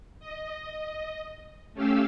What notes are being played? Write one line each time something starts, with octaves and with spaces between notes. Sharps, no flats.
D#5
A3 C#4 G4 F5 E6